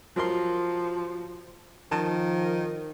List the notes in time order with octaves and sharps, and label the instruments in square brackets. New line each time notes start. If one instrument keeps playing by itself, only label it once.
[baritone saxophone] F3 [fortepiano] F#3 A#4 C6
[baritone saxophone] D#3 [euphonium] F3 [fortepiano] A5